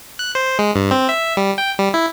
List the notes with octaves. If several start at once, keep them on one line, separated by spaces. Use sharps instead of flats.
F#6
C5
G#3
G2
C4
E5
G3
G5
G3
E4